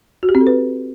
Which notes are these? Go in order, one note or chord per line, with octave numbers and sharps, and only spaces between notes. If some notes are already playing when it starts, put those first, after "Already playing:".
F#4
G4
C4
A4
B4